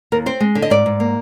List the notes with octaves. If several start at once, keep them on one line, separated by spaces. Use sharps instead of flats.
D#2 A#4
C4 C5
G#3
D3
D#5
G#2 D5
G#2
A#3